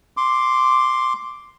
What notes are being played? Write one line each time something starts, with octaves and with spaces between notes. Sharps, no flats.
C6 D6